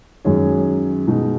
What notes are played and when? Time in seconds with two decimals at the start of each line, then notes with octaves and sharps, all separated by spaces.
0.25 F#2 D#3 G#3 C#4 G#4
1.07 B2 G#3 D#4